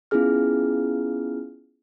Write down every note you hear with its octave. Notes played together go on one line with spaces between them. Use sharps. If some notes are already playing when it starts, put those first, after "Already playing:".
B3 C#4 E4 F4 G#4 F6